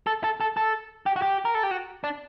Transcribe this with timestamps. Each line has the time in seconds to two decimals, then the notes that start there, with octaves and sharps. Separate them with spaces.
0.07 A4
0.24 A4
0.41 A4
0.57 A4
1.06 G4
1.16 F#4
1.22 G4
1.45 A#4
1.55 A4
1.63 G4
1.71 F#4
2.04 D4